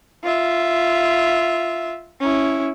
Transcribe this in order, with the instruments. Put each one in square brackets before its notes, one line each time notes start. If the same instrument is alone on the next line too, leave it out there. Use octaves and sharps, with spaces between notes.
[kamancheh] F4 E5
C#4 E4